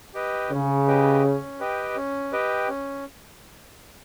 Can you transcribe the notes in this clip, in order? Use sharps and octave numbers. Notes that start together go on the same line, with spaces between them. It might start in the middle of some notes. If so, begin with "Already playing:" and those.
G4 B4 D#5 G5
C#3 C#4
G4 B4 D#5 G5
C#4
G4 B4 D#5 G5
C#4
G4 B4 D#5 G5
C#4